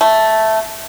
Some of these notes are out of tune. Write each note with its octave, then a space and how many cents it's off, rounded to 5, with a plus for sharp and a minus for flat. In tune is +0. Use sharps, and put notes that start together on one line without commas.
A3 +0